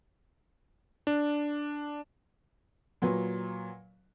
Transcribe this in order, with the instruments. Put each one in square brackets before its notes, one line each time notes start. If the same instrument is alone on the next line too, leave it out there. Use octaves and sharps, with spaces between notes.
[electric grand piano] D4
[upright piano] A#2 F#3 B4